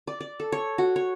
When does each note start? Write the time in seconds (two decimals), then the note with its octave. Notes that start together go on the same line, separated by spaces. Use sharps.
0.07 D5
0.20 D5
0.40 A4
0.52 C#5
0.78 F#4
0.96 C#5